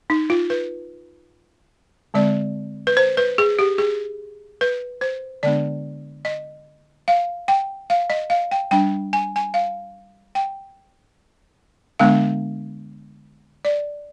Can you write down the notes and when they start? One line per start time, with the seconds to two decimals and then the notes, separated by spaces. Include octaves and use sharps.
0.10 D#4
0.30 F4
0.50 B4
2.14 D3 G#3 C4 D5
2.87 B4
2.97 C5
3.17 B4
3.38 G#4
3.59 G4
3.78 G#4
4.61 B4
5.01 C5
5.43 D3 G#3 B3 D4 D5
6.25 D#5
7.08 F5
7.48 G5
7.90 F5
8.10 D#5
8.30 F5
8.51 G5
8.71 G3 D4 G5
9.13 G#5
9.36 G#5
9.54 F5
10.35 G5
11.99 D3 G#3 B3 D4 F5
13.65 D5